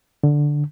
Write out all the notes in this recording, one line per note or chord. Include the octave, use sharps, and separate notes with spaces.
D3